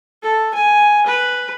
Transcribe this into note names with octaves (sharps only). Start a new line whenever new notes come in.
A4
G#5
B4